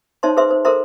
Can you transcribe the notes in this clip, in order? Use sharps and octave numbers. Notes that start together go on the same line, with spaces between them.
D#4 C5 C#5 E5 A5 C6
G#4 B4 C5 E5 C6
C5
A4 A#4 C5 E5 A#5 C6